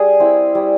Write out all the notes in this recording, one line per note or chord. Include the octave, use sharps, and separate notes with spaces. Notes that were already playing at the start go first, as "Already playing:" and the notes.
Already playing: G3 G#4
C4 E4
G3